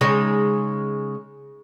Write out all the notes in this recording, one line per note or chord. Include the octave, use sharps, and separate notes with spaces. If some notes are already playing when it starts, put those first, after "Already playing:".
C#3 G#3 D#4